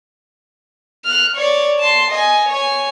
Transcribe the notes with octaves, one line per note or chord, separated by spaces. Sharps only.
F6 F#6
C#5 D5
A5 C6
D#5 G#5
C#5 G#5